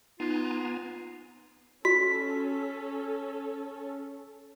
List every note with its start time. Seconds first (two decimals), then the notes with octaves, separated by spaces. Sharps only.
0.20 B3 D#4 F4 G#5 A#5
1.85 C#4 F#4 A4 B6